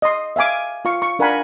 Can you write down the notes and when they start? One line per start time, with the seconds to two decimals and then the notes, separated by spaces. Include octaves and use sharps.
0.02 D#5 C6
0.36 E5 F5 G#5 D6
0.85 F4 F5 C#6
1.02 C#6
1.19 D4 A#4 F5 F#5 G#5 B5